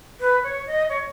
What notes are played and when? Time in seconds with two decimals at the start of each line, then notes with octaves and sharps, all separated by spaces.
0.20 B4
0.43 C#5
0.67 D#5
0.89 C#5